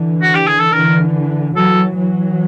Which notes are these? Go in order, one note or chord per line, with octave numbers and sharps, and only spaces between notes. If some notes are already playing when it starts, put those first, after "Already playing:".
Already playing: D3 E3
F#4
G4
G#4
A4
D3 E3 A#4
E3 F#3 A4
E3 F#3